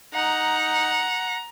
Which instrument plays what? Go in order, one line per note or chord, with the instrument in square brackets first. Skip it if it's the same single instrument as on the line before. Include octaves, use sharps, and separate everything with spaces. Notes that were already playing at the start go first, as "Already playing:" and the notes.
[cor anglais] D#4 [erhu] F#5 [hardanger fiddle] A#5